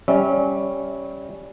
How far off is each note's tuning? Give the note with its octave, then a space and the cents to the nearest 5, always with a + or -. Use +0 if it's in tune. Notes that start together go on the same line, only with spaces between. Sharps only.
G3 +0 C#4 +0 E5 -30